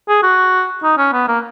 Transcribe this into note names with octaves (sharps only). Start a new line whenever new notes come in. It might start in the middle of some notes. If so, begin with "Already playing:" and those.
G#4
F#4
D#4
C#4
B3
A#3